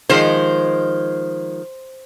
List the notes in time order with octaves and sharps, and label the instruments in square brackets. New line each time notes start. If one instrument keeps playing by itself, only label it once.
[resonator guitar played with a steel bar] D#3 F3 G#3 [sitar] C5